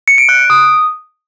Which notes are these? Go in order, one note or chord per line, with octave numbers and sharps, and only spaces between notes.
C#7
D7
F#6
D7
D#6